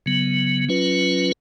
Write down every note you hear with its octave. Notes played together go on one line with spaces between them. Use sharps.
C#3 F#3 B3
F#3 C#4 F4 B4